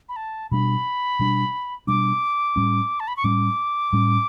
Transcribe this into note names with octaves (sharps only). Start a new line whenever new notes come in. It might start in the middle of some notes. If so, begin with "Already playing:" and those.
B5
A5
B2 G3 D4 B5
B2 G3 D4
B2 G3 D4 D6
A2 G3 C#4
A5
B5
C#6
A2 G3 C#4 D6
A2 G3 C#4